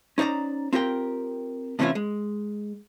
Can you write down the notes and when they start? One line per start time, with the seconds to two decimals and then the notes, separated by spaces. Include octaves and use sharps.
0.18 C#4 D#4 C5 D5 A#5
0.73 C4 F4 G4 A#4 G5
1.79 A2 C3 E3 C#4 E4 F4
1.95 G#3